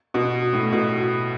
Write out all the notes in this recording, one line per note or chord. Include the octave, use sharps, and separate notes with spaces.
B2
A2
B2